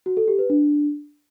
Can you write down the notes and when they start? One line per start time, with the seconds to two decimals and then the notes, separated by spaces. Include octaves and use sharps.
0.06 F#4
0.17 A4
0.28 G4
0.39 B4
0.50 D4